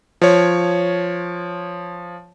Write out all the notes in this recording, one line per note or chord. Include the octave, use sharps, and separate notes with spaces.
F3 C#5